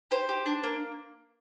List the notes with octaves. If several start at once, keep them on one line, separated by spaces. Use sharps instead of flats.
G4 C5
G4
D4
A#3